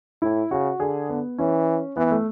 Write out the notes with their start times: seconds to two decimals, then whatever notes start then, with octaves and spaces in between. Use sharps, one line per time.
0.22 A2 E4
0.51 C#3 F#4
0.80 D3 G#4
1.10 B3
1.38 E3 C#4
1.96 E3 B3
2.11 A3